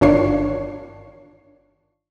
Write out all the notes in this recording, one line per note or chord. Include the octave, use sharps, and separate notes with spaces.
G1 D#3 D4 F4 C#5 C7